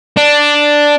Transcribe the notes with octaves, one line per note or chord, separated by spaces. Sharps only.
D4